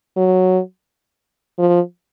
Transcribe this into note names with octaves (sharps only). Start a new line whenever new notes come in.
F#3
F3